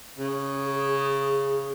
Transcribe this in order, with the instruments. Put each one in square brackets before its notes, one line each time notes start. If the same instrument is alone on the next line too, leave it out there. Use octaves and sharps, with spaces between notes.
[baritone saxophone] C#3 [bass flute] G#4